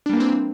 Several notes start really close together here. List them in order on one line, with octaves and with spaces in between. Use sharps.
D4 G3 A#3 E3 C4